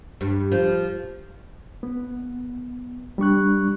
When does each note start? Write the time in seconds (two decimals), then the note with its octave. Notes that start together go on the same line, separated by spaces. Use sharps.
0.21 G2
0.52 F3
1.83 B3
3.18 G3 D4 C#6 F#6